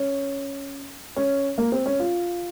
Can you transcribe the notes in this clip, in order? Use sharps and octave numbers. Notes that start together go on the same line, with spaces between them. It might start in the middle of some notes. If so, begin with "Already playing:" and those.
Already playing: C#4
C#4
A#3
C4
C#4
F4